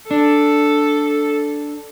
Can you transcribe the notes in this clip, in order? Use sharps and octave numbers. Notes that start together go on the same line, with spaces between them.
D4 A4